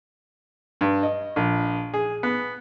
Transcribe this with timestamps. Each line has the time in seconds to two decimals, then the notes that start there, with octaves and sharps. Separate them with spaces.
0.81 G2
1.03 D#5
1.36 A#1
1.94 G#4
2.23 B3